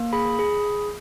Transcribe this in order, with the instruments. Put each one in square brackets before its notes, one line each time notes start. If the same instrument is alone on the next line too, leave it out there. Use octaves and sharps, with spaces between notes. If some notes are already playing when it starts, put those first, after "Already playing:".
Already playing: [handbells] A#3
G#4 B5
G#4